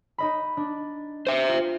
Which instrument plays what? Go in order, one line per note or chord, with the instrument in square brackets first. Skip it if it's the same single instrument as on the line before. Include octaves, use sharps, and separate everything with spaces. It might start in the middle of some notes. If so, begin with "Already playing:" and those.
[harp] D#4 D#5 B5
D4
[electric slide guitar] C5 E5
[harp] F4